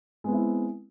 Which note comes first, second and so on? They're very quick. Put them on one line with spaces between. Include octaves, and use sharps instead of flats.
G#3 B3 C4 E4